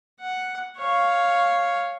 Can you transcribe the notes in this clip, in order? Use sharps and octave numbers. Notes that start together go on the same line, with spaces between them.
F#5
C#5 F5